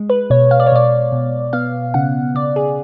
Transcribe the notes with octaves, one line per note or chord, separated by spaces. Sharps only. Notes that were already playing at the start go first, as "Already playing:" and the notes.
Already playing: G#3
B4
B2 C#5
F5
D5
C#5
B2 D5
B2
B3 F5
C#3 F#5
C#3 D5
G#4